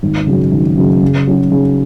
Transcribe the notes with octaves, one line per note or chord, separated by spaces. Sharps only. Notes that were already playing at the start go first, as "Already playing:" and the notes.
G#1
F#2 C#3
G#1
F#2 C#3
C#3
F#3 C#4 F#4
C#3